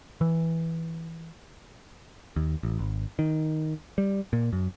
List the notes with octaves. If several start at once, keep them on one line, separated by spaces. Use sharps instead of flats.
E3
D#2
A1
G#1
D#3
G3
A#2
F#2